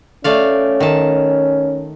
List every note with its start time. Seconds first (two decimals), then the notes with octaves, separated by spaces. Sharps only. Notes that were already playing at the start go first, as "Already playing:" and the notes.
0.24 A3 C#4 D5 F5
0.80 D#3 A5